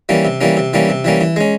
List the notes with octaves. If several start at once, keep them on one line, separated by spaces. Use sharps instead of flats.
E3 G3 A#3 C#4
C3
E3 G3 A#3 C#4
C3
E3 G3 A#3 C#4
C3
E3 G3 A#3 C#4
E3
G#3 C#4